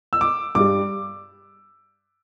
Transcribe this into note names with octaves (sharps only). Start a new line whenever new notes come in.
E6
D6
G2 D6
G3